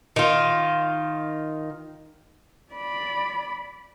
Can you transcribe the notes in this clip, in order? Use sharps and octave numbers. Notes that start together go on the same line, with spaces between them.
D#3 F4
D5 B5